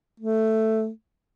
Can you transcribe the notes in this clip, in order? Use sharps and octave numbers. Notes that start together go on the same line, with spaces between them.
A3